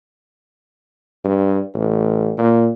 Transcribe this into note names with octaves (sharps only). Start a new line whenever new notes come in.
G2
A1
A#2